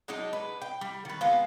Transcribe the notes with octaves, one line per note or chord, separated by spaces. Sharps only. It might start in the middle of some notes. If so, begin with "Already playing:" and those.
F#3 G#3 D4 D#4
B4
G5
G3
D#3 B4
G#3 B3 C4 F4